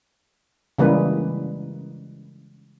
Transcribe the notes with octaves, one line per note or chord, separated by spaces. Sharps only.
C#3 E3 G3 G#3 A#3 B4